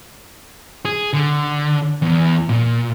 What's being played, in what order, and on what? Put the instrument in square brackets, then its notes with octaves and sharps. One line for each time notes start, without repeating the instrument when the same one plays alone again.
[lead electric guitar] G#4
D3
E2
A#2